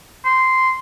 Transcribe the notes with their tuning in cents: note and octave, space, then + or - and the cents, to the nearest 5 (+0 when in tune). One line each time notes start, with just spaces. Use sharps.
C6 -10